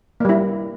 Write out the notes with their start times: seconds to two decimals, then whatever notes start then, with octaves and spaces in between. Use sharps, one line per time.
0.20 A#3
0.25 G3
0.29 E4